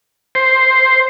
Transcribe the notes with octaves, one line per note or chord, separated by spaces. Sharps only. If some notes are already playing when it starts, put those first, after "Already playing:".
C5